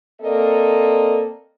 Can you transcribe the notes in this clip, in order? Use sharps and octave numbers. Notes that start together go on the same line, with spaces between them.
A#3 C4 A4 D5 D#5